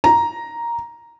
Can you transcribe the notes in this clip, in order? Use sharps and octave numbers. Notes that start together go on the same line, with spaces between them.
A#5